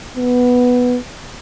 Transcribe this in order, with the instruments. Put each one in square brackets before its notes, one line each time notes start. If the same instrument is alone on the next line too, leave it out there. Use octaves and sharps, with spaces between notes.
[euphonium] B3